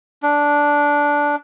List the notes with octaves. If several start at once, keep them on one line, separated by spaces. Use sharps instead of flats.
D4